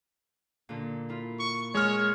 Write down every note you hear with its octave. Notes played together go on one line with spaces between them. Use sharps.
A#2 D3
E4 F4
C#6
G#3 C#5 F6